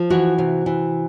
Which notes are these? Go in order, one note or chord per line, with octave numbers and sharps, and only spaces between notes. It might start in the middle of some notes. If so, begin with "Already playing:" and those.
Already playing: F3
E3 F#4
C3
E3